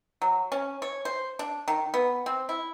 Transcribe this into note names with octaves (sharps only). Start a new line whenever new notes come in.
F#3
C#4
C#5
C5
D4
D#3
B3
C4
E4